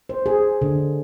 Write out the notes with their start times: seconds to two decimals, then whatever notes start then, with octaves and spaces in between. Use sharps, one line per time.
0.09 C5
0.26 G#4
0.62 D3